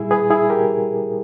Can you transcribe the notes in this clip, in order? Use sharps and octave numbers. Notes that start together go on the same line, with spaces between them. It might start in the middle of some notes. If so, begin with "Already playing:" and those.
Already playing: A#2 G3 E4 G#4
G#4 B4
E4 G#4
G4 A#4